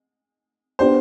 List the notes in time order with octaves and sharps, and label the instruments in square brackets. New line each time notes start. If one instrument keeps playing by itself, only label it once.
[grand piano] B3 D4 G4 D5 [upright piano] C5